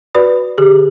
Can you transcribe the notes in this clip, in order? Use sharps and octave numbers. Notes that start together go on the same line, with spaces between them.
F#4 B4 D5 B5 D#6
D3 G4 G#4